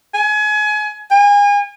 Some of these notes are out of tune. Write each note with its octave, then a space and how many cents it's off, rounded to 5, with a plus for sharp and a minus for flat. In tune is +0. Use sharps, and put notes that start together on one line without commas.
G#5 +30
G#5 -35